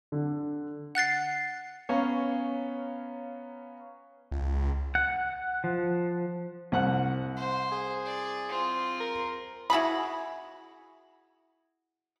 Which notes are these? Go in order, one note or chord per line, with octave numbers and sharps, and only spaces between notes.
D3
F#5 F#6 A6 C7
B3 C#4 C#5 F5 A#5
C#2
F#5
F3
C2 F#5 F#6
C5
G#4
D5
C4 F4
A#4
E4 F#4 G#4 B5